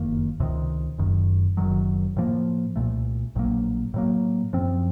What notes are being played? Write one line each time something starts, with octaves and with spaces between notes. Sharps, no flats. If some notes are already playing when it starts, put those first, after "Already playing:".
Already playing: F#1 F2 D#3 A#3
C#2 C3 D#3
F#1 F#2 D#3
F#1 F#2 D#3 F#3
A2 F3 A#3
C2 A#2 A3
A#1 A2 F#3 A#3
A2 F#3 A#3
F#2 F3 C4